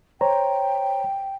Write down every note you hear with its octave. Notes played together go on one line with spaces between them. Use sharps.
C5 C#5 G5 A#5